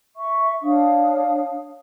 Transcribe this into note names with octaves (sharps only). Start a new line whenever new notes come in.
E5 C#6
D4 C#5 F5 D#6